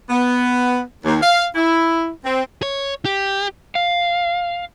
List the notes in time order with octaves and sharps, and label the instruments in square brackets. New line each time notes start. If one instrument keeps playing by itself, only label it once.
[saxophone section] B3
D#2
F5
E4
C4
[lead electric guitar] C#5
G4
[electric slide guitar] F5